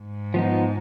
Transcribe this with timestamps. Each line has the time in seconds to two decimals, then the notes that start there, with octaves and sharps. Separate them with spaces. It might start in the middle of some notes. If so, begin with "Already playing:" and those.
Already playing: G#2
0.34 F3 B3 D#4